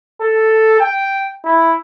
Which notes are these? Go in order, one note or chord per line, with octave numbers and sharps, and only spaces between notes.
A4
G5
E4